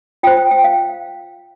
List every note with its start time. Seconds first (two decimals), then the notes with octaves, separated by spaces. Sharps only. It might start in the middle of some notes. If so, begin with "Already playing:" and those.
0.23 F4 G5
0.27 C5
0.37 G5
0.51 G5
0.64 F5